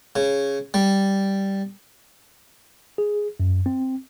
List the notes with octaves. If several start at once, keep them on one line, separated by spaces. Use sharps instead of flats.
C#3
G3
G#4
F#2
C4